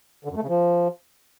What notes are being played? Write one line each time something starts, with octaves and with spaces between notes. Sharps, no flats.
D3
F#2
A3
C#3
F3